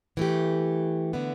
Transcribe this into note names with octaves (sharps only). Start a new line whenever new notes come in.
E3 A3 G4
D3 B3 E4